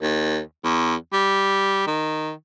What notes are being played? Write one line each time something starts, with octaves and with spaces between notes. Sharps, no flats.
D#2
E2
G3
D#3